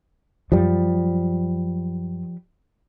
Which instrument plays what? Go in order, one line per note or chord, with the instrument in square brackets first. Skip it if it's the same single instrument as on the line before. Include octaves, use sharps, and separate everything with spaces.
[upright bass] F#2 [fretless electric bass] F3 G3